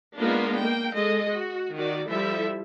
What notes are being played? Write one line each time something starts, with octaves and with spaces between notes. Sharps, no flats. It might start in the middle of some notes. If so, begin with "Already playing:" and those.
G#3 A#3 B3 D4 D#4 F4
A#3 G5
G#3 A4 D#5
F#4
D#3 F#4 D5
F3 G3 E4 A4 E5